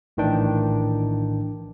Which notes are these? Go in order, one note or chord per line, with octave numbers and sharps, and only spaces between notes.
A#1 A2 D#3 E3 D4 G5